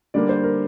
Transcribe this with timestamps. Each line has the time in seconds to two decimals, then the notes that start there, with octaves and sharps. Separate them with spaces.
0.14 D3 G3 A#3 D5
0.29 C5
0.44 A#4